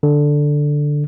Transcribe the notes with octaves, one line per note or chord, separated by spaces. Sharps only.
D3